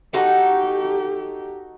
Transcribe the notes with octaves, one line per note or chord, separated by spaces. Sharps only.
D#4 F#4 G4 A4